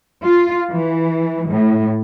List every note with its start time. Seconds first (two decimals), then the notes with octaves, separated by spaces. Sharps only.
0.23 F4
0.73 E3
1.49 A2